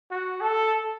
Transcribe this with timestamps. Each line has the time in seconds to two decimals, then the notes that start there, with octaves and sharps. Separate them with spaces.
0.11 F#4
0.41 A4